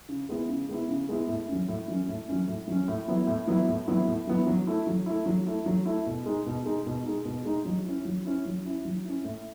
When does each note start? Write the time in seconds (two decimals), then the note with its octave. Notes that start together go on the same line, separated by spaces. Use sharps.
0.09 C#3
0.29 G#3 B3 E4
0.49 C#3
0.69 G#3 B3 E4
0.88 C#3
1.09 G#3 B3 E4
1.28 A2
1.48 F#3 C#4
1.68 A2
1.88 F#3 C#4
2.08 A2
2.29 F#3 C#4
2.48 A2
2.68 F#3 C#4
2.88 A2
3.08 F#3 B3 E4
3.27 A2
3.47 F#3 B3 E4
3.68 A2
3.88 F#3 B3 E4
4.07 A2
4.27 F#3 B3 E4
4.47 F#3
4.67 A3 E4
4.87 F#3
5.06 A3 E4
5.26 F#3
5.47 A3 E4
5.66 F#3
5.86 A3 E4
6.06 B2
6.26 G#3 D#4
6.46 B2
6.66 G#3 D#4
6.86 B2
7.05 G#3 D#4
7.25 B2
7.45 G#3 D#4
7.65 F#3
7.85 C#4 E4
8.05 F#3
8.25 C#4 E4
8.45 F#3
8.65 C#4 E4
8.85 F#3
9.04 C#4 E4
9.24 A2